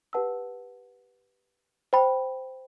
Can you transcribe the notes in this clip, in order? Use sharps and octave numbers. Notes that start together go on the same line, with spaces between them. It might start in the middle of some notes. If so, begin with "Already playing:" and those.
G4 B4 F#5 A5 E6
C5 G5 B5